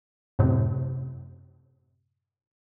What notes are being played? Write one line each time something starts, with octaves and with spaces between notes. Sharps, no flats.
F#2 A2 C3